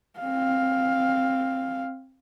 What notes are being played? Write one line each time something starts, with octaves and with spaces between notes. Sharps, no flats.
C4 F5